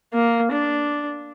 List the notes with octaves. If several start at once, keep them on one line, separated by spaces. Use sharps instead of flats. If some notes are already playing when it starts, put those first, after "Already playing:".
A#3
D4